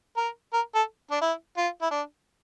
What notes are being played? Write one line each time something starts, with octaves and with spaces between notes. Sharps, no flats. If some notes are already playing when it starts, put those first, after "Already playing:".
A#4
A#4
A4
D4
E4
F4
E4
D4